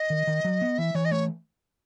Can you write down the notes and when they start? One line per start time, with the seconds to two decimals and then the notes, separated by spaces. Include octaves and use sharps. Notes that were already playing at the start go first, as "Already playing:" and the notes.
Already playing: D#5
0.10 D#3
0.27 D#3
0.45 F#3
0.62 B3
0.78 E3 E5
0.95 E3 C#5
1.05 D#5
1.11 A3 C#5